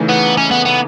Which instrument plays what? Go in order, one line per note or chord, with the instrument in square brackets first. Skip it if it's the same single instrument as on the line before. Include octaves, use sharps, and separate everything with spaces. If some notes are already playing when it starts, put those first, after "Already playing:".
Already playing: [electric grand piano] C#3 E3 A3 D#4
[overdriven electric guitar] B3
C#4
B3
B3